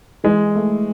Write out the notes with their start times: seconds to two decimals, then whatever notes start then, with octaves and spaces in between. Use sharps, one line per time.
0.24 E3 G#3
0.56 A3